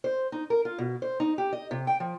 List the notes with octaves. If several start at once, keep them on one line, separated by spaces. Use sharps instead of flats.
C5
D#4
A#4
F4
B2
C5
D#4
G4
D#5
C3
G5
F3